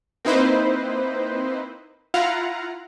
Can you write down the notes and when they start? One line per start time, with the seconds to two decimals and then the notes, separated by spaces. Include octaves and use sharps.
0.25 A#3 C4 D#4 E4 B4 C5
2.14 E4 F4 F5 F#5 A#5